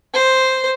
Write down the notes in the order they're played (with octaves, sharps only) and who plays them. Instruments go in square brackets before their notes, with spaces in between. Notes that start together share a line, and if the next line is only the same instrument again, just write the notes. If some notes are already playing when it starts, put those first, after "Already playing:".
[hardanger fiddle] C5